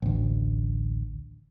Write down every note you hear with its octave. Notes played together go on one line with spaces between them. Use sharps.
A1 D2